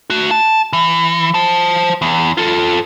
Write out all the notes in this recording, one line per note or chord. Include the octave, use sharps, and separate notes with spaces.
A3 F#4
A5
E3
C5 A5
E2
F4 A4